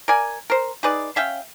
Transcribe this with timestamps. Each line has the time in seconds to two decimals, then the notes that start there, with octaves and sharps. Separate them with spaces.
0.08 A#4 D5 G#5
0.50 A#4 C5
0.83 D#4 G#4 B4 D5
1.16 C#4 E5 F5 G5